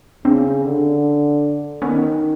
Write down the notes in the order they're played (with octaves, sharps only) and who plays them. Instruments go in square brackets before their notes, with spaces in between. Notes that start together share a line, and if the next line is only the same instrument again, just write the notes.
[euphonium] C#3 [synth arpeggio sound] C4 D4
[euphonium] D3
[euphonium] D#3 [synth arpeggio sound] B3 C#4